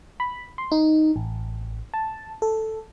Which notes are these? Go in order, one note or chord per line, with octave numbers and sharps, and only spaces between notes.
B5
C6
D#4
A1
A5
A4